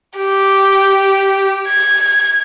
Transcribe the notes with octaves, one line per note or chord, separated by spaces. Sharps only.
G4
G#6